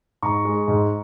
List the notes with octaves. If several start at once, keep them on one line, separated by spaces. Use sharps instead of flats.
G#2 A#5 C#6
G#3
G#2